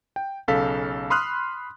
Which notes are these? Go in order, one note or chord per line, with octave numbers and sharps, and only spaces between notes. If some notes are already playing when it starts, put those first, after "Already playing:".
G5
B1 C#3 A4 F5 B6
B5 C6 D#6 F6 F#6